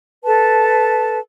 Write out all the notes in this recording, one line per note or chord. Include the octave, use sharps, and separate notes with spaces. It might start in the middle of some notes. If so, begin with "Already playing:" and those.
A4 B4 A5